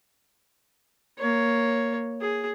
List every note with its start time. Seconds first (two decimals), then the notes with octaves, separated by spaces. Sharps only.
1.19 A#3 C#5
2.21 G#4